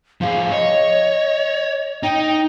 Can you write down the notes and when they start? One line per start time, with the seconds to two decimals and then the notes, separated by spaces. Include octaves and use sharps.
0.21 F3 G#4 F5
0.51 C#5 D#5
2.03 D#4 G5